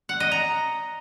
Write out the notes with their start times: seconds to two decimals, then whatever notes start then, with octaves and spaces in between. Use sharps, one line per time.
0.09 F#5
0.20 D#5
0.32 A#5